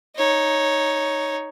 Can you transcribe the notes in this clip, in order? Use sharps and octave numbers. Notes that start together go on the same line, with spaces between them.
D#4 C#5